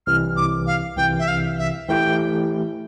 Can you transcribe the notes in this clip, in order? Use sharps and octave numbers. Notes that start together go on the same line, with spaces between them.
C2 C3 E3 F6
D6
F5
C2 C3 E3 G5
E5
F5
E5
E3 A3 E4 G4 G5